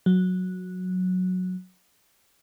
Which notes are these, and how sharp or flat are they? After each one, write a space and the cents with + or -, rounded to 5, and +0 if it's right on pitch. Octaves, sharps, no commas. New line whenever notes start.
F#3 -10